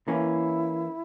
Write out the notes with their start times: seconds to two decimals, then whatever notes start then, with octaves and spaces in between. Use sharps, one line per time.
0.08 E3 A#3 C#4 E4